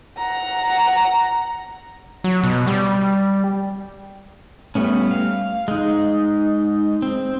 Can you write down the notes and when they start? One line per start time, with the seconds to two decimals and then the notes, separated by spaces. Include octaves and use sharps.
0.18 F#5 A#5
2.24 F#3
2.44 B2
2.67 G3
4.75 G3 A3 B3 C#4
5.11 F5
5.68 G#3 D#4
7.02 C4